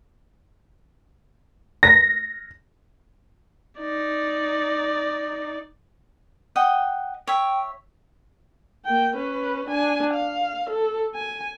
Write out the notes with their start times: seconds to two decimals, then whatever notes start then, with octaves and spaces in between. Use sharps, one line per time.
1.83 A#6
3.80 D#4 D5
6.56 D#5 F#5 G5
7.27 C#5 E5 G5
8.85 A#3 G5
9.16 C#4 B4
9.69 D4 G#5
10.14 F5
10.70 A4
11.15 G#5